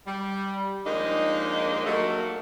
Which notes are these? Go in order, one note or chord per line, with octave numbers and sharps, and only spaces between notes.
G3
D#2 F3 G#3 A#3 D4 D#4
F#3 A3 A#3